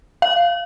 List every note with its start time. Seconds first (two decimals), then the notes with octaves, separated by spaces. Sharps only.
0.22 F5